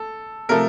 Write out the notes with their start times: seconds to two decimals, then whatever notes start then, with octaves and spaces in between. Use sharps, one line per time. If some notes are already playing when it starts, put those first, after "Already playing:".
Already playing: A4
0.49 C3 F3 A3 A#4